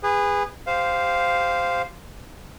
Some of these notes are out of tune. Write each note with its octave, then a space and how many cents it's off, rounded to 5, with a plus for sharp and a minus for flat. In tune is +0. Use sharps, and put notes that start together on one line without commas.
G#4 -25 B4 +5
G4 +0 C5 -10 F5 +0